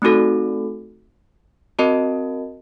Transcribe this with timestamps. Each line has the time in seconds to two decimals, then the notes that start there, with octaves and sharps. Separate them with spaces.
0.02 A3 C4 D#4 F#4 A4
1.79 C4 F#4 A#4 D#5 A5